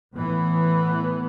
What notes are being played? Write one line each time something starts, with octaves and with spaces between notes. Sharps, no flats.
A2 E3 B3